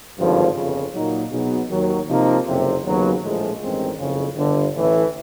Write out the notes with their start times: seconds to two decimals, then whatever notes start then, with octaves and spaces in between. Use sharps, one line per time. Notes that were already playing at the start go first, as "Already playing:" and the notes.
0.17 G#1 G2 D3 F3
0.55 G1 F2 C#3
0.93 A#2 F#3 A#3 D#4
1.30 B2 F#3 B3 D#4 G#4
1.69 D#2 D#3 F#3
2.07 C3 F3 A#3 D#4
2.45 F#1 F2 C3
2.83 D#2 C#3 F#3 B3
3.21 A#1 A2 F3 G#3
3.60 A1 G2 D#3 G#3 C4
3.98 F#1 F2 C#3
4.35 G1 G2 D3
4.74 A1 A2 E3